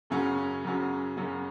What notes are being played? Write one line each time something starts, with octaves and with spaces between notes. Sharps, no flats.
F#2 C#3 F#3 C#4
F#2 C#3 F#3 C#4
F#2 C#3 F#3 C#4